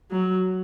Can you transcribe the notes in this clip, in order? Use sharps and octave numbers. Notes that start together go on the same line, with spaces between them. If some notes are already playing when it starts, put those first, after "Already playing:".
F#3